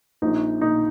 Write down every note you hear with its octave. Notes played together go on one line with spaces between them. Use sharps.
A#1 D#4
A#2 D#4